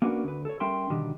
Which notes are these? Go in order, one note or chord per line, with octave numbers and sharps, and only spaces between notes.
A#3 C#4 D4 F#4 A#4 B4
D2 B4
A4 C#5
G3 C#4 A#4 E5 G5 C6
B2 D3 D#3 G3